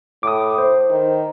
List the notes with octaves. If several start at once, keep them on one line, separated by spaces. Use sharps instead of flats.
A2 D6 D#6
C5
D#3